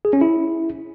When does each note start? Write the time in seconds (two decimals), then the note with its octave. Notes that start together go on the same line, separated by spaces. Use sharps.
0.05 G#4
0.13 C#4
0.21 E4